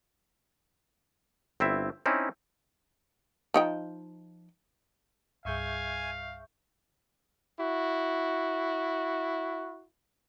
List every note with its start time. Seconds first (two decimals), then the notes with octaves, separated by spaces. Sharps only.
1.60 G1 C4 E4 E5
2.06 C4 C#4 D#4 E4
3.54 F3 D#4 G5
5.45 C2 G2 G#4 E5 F5 G#5 C#6 G6
7.60 E4 F#4